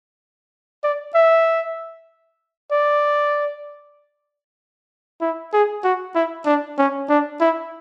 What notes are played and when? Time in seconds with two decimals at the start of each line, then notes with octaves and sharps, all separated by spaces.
0.84 D5
1.15 E5
2.71 D5
5.21 E4
5.53 G#4
5.84 F#4
6.15 E4
6.46 D4
6.78 C#4
7.09 D4
7.40 E4